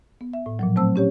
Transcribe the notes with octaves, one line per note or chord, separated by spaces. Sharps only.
B3
E5
A2
A#2 F3 F#3
F#3 A3 C4 C5 A5 E6
C#4 G4 C#5